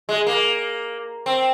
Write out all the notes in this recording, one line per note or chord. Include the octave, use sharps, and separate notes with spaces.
G#3
A#3
C4